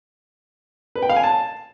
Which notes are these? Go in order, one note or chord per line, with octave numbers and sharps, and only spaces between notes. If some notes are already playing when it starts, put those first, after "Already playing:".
B4
G5
F5
G#5
A5